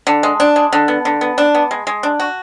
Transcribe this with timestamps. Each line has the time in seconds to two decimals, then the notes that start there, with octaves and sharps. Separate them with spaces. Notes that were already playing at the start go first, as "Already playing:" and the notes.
0.07 D3
0.23 G#3
0.40 D4
0.56 G#3
0.73 D3
0.88 B3
1.05 D3
1.21 B3
1.38 D4
1.55 B3
1.71 G#3
1.87 G#3
2.03 D4
2.20 F#4